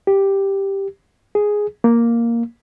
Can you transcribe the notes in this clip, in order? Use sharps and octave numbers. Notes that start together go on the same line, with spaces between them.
G4
G#4
A#3